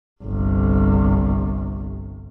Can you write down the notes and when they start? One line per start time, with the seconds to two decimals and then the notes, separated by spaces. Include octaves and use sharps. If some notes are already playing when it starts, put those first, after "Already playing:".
0.23 G1 C2